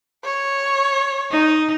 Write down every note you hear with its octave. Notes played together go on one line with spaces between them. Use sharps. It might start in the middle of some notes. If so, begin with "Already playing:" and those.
C#5
D#4